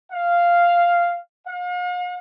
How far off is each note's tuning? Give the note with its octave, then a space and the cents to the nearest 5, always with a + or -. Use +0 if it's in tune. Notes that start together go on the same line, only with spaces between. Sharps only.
F5 -5
F5 +45